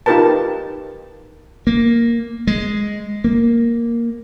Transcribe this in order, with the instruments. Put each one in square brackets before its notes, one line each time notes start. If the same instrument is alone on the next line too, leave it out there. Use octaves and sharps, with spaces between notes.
[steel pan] D#4 F4 G4 A#4 B4 A5
[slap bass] A#3
G#3
A#3